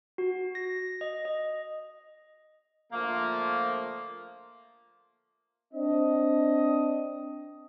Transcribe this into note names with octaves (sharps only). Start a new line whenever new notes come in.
F#4
A#6
D#5
D#5
D3 F3 A3 A#3
C4 D4 D#5